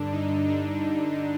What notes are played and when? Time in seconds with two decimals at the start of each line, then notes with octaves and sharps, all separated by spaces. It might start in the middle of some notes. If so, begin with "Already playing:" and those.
Already playing: G2 D3 D4
0.12 D#4
0.48 D4